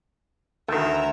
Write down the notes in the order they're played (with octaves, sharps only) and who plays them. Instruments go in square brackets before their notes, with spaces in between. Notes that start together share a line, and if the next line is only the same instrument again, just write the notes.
[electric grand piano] D2 [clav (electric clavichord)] D#3 A3 [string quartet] E5 A#5